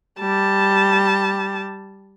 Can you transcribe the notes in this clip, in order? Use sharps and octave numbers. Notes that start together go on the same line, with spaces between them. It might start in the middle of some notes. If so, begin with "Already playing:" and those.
G3 A5